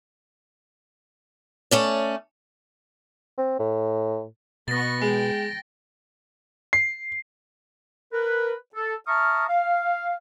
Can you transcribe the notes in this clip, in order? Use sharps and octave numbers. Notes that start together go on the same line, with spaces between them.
A3 C#4 D5
C4
A2
B2 B3 C#6 A6 A#6
G#3 G5
C7
A#4 B4
A4
E5 A5 A#5 C#6 D#6 F6
F5